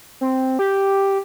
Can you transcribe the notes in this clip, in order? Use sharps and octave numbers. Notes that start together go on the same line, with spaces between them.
C4
G4